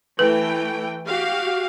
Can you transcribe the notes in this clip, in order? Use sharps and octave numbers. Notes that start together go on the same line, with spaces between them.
E3 A3 B4 G5
F#4 G4 F5